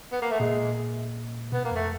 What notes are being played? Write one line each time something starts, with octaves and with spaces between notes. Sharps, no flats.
B3
A#3
A3
A#2 G#3
B2 B3
A#3
F2
A3